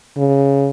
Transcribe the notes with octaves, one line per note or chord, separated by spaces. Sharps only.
C#3